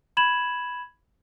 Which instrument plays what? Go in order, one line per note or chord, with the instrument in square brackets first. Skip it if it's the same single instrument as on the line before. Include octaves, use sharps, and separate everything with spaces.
[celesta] B5 G#6 E7 F#7